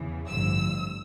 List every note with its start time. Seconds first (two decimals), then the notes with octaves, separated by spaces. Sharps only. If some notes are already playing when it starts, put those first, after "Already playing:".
Already playing: E2 C#3 E3
0.28 A1 G2 D3 F3 E6